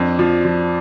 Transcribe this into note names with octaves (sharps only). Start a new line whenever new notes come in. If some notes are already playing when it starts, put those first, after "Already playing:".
Already playing: F2 D4
F3
F3